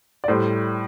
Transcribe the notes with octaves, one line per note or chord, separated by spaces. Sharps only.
D5
A2 G3 C5